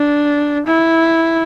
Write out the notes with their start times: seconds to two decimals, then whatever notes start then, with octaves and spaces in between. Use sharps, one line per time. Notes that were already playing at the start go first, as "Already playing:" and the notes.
Already playing: D4
0.67 E4